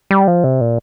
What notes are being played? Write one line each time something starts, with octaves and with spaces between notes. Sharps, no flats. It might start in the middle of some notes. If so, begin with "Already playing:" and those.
G3
F3
C3
A#2